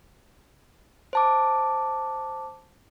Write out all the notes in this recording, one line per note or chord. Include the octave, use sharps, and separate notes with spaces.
C5 A5 D6